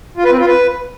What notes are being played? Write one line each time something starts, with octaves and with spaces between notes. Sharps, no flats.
F4
B4
C4
F4
B4